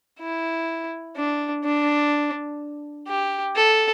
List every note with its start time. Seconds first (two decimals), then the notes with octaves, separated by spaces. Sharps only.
0.20 E4
1.16 D4
1.64 D4
3.07 G4
3.56 A4